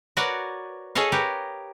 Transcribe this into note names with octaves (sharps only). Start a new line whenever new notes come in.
F#4 A#4 B4 C#5 D5
G#4 A4 C#5 D#5 F5
G4 A#4 B4